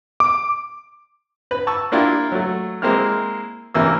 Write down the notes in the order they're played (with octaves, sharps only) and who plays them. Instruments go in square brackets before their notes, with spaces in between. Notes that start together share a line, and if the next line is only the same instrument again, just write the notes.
[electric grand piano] D6
[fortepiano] B4 B5
A5 C#6 E6
A#3 D4 E4 F4 G4
F#3 A3
G#3 A#3 C4 E4 F6
A1 C3 E3 A#3 E6